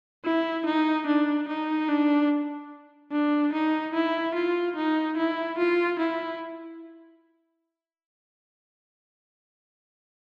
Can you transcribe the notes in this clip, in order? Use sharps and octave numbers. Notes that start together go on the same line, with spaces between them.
E4
D#4
D4
D#4
D4
D4
D#4
E4
F4
D#4
E4
F4
E4